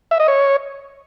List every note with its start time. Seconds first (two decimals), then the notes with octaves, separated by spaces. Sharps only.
0.11 E5
0.20 D#5
0.28 C#5